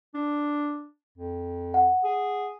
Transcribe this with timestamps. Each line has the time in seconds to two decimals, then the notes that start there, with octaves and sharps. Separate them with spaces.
0.14 D4
1.17 F2
1.74 F#5
2.04 G#4